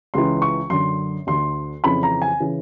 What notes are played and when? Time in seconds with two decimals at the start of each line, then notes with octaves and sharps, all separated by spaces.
0.14 C#2 C#3 E3 C6
0.42 C#6
0.70 F#2 D3 C6
1.27 D2 D3 C6
1.84 F2 C#3 E3 B5
2.03 A#5
2.22 G#5
2.40 C#3 E3